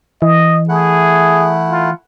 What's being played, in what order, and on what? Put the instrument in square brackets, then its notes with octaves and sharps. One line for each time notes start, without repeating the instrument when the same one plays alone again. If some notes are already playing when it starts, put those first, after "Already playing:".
[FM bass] E3 [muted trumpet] D#5
[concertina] A3 E4 F#5 [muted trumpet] G#4
[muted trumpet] F4